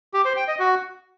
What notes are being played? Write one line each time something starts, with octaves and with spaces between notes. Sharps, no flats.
G4
C5
G5
D#5
F#4